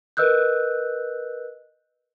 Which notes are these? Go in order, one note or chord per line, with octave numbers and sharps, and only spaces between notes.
A#4 B4 D#5 E6 F#6 G6